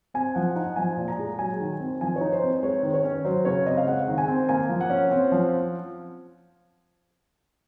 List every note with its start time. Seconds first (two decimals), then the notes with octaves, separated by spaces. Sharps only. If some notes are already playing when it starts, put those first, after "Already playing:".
0.14 C4 G#5
0.35 F3 F#5
0.56 D#4 F#5
0.76 F3 G#5
0.97 A#2
1.08 A#5
1.18 G#3
1.38 F#3 G#5
1.60 D#3
1.80 C4
2.01 F3 G#5
2.16 D#4 C#5
2.32 C5
2.43 C4
2.63 G#3 C#5
2.83 D#3
2.94 C#5
3.04 C#4
3.25 F#3 C5
3.45 C#3 C#5
3.66 C4 D#5
3.77 F5
3.86 G#3 F#5
4.08 D#3
4.18 G#5
4.28 C4
4.49 A#3 G#5
4.69 F3
4.81 F#5
4.90 C#4
5.11 C4
5.32 F3